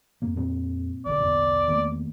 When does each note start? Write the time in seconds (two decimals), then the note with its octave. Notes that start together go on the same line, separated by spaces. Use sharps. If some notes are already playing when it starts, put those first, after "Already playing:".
0.22 F2 A#3
0.36 A#2 G3 C4
1.05 D1 B1 D3 D5
1.21 E2
1.68 D#3 A3 A#3